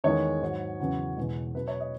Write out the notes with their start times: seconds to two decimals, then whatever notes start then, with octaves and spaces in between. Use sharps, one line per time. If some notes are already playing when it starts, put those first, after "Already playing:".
0.04 E2 D#3 G#3 C#5
0.42 G#2 F#3
0.80 E2 C#3 F#3
1.17 E2 B2 G#3
1.55 B2 F#3 B4
1.68 C#5
1.80 D#5